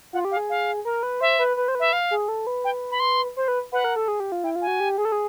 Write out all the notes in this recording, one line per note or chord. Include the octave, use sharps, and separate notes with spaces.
F4 F#5
G4
F5
G#4
F5
A#4
B4
C5 E5
B4
B4
C5
B4 E5
F5
G#4
A4
B4
G5
B5
C6
C5
B4
B4 F#5
A#4
A4
G#4
G4
F4
E4 G5
F4
G#5
F#4
G4
G#4
A4
G#4